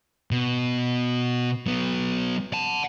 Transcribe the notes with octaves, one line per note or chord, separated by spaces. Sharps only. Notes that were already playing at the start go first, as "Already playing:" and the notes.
B2
F#3 B3
F#5 A5